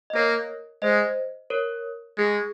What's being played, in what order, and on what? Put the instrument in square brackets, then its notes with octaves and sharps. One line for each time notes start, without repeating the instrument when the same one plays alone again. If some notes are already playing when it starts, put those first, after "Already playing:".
[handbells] D#5
[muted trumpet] A#3 [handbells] A#4 C#5
[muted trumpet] G#3 [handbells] C5 D#5
[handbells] A#4 C#5
[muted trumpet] G#3 [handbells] G#4